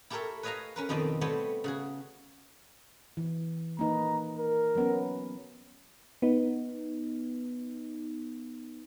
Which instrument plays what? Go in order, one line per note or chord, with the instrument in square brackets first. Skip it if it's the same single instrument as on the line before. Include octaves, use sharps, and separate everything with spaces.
[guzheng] E4 G4 A4 A#4 C#5 E5
B4 C#5 D#5 F5 G#5 A#5
C#4 A#4 B4
F2 B2 D#3 C4 D5
G3 A3 B3 C4 G4 C#5
C#3 F#4 G#4
[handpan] E3
[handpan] A#3 D#4 B4 [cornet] A#5
[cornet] A#4
[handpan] F#3 B3 C#4
[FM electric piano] B3 D#4